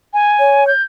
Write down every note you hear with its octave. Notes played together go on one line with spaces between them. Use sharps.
G#5
C#5
G6